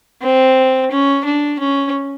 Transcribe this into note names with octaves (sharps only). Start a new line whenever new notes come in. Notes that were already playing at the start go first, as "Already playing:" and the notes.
C4
C#4
D4
C#4